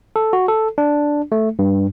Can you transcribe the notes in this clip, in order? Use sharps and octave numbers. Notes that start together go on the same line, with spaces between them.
A4
F#4
A4
D4
A3
G2